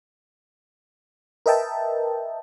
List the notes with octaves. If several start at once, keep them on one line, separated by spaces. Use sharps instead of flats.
A#4 B4 D#5 E5 G5 A5